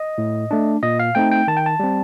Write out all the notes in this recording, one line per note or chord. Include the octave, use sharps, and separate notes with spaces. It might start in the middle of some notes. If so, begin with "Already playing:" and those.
Already playing: D#5
A2
A3 D4
A#2 D#5
F5
A3 C4 D#4 G5
G5
D#3 A5
G5
A5
G3 C4